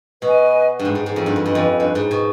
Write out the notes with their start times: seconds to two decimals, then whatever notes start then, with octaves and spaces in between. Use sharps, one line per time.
0.22 B2 B4 D#5 G#5
0.79 G2
0.85 G#2
0.95 G#2
1.06 G#2
1.16 F2
1.26 G2
1.36 F2
1.46 G2 B4 D#5 G#5
1.55 F2
1.80 G2
1.95 G#2
2.11 B2